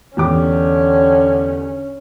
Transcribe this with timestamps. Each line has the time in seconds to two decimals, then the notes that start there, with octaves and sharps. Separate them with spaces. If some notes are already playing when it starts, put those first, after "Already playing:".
0.17 E2 D3 C#4 G4 D6